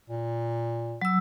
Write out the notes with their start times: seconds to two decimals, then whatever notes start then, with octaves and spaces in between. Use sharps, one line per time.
0.10 A#2
1.01 F#3 E6